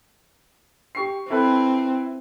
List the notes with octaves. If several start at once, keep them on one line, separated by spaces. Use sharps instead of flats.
G4 C#6 C7
C4 E4 A4 B4